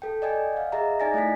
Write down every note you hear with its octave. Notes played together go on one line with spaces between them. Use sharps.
A4 G5
D5 D#5 G5 G#5
F5 F#5
G#4 D#5 E5 A#5
D#4 D5 G#5 A6 A#6
A3 E4 D#5 G#5 B6